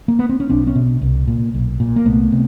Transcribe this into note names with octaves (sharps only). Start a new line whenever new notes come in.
A#3
B3
C4
C#4
B1 C4 D4
B3 C#4
B2
C2
A#2
B1
A#2
A#3
C2 A3 B3
C3